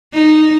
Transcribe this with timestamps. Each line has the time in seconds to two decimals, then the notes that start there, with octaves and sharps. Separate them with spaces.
0.14 D#4